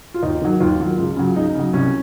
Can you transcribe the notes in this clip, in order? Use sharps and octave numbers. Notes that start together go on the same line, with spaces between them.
F4
D#2 D#4
D#3 F#3
D#2 F4
D#3 F#3
C#2 F4
C#3 F#3
C#2 D#4
C#3 F#3
C2 C#4